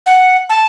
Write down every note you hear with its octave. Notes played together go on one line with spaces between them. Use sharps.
F#5
A5